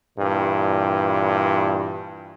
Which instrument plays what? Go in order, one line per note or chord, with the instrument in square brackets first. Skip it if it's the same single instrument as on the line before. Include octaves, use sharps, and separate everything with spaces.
[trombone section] G2 A#2 E3